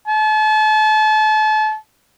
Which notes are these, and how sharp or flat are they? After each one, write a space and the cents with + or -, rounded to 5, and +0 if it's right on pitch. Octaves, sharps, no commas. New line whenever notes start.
A5 -35